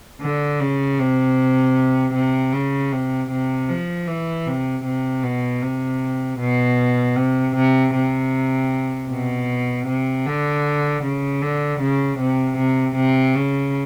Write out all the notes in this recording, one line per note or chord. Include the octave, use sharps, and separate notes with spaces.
D3
C#3
C3
C3
C#3
C3
C3
F3
E3
C3
C3
B2
C3
B2
C3
C3
C3
B2
C3
D3
C#3
D3
C#3
C3
C3
C3
C#3